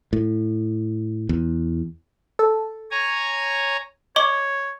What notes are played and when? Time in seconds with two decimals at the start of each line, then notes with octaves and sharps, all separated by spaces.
0.13 A2
1.29 E2
2.39 A4
2.91 C#5 G#5 A#5
4.16 C#5 D#5 C#6 D6